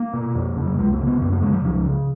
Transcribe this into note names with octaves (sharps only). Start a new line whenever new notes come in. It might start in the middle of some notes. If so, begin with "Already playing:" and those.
Already playing: A#3
B2
F2
C#3
F#3
C#2 G#3
A#3
C#3
B3
F#2 B3
A#3
C#3 G#3
F#3
C#2 F3
C#3